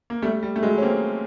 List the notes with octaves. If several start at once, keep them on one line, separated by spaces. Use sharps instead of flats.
A#3
G3 A3
G3
A3
F#3 G#3
C#4
A#3 C4